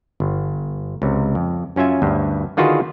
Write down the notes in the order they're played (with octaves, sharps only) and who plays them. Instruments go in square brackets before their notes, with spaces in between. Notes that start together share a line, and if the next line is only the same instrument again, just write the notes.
[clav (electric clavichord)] G1
C#2 C3
F2
F#2 C#4 F4 E5 G#5
D2 G2
D3 D#3 F4 F#4 G#4 B4